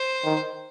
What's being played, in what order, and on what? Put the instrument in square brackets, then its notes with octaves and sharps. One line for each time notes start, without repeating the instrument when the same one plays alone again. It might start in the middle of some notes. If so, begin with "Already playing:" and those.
Already playing: [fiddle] C5
[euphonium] D#3